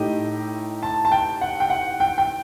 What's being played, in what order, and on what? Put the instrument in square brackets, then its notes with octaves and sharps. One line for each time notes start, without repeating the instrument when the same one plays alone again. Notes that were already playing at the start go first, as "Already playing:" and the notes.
Already playing: [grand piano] A2 A3 D#4 G4 [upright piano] D#5
[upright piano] A5
A5
G5
F#5
G5
F#5
G5
G5